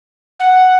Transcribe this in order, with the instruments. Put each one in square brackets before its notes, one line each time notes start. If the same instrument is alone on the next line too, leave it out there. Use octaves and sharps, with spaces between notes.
[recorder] F#5